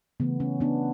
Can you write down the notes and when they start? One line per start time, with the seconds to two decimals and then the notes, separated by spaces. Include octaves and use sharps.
0.20 C#3 E3 A3 B3
0.40 C#4
0.60 B3 D4